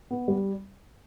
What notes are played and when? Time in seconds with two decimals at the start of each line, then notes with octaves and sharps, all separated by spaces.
0.11 B3
0.28 G3